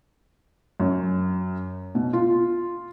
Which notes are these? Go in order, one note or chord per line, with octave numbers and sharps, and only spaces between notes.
F#2
B2
F4